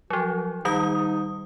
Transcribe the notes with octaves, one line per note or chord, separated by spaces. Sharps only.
F3 F#3 F#4
D#3 G3 D#4 D#6